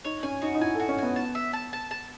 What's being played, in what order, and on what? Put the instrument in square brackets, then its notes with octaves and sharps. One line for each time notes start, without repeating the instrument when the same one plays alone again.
[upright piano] D#4 [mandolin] C#5
[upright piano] C#4 [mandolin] G#5
[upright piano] D#4 [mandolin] F#4
[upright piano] D#4
[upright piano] E4 [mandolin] G#5
[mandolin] F#4 [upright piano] A4
[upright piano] C#4
[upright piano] B3 [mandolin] G#5
[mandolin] A5
E5
A5
A5
A5